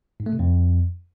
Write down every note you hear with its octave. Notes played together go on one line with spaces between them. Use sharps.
G#2
A3
C3
F2